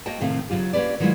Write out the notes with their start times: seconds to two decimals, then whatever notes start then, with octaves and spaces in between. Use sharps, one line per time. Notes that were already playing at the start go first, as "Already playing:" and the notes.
0.06 A#3 F#4 C5 D#5 G5 A5
0.21 A2 C3 D#3 A3 C4 F5
0.50 C#3 E3 F#3 F4 G4
0.73 A#3 C#4 D#4 G4 B4 D5
1.00 D#3 F#3 G#3 E4 F4